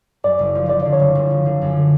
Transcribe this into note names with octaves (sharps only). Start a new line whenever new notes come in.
F#2 D5
F#1
F3
F3 D5
D3 D5
C#5
F#1
F#1
F3
D3
F#2
D3